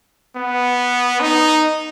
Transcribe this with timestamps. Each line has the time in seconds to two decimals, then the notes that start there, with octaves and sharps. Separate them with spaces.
0.36 B3
1.20 D#4